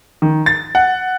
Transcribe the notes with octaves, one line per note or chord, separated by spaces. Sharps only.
D#3
A6
F#5